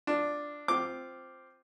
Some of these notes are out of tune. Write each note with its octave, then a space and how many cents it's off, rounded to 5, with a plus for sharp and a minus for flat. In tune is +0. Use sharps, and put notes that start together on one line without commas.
D4 +0 F4 -5
C4 +0 F4 +0 D6 +0